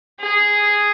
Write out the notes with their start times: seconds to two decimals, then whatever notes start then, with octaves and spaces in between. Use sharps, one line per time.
0.21 G#4